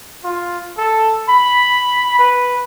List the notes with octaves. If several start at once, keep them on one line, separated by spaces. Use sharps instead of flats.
F4
A4
B5
B4